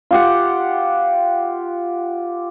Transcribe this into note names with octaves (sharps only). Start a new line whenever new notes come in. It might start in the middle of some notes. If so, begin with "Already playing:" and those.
F4 G4 F#5